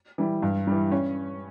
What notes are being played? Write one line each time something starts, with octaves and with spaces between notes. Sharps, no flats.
E3 G3
G2
E3 G3
C#4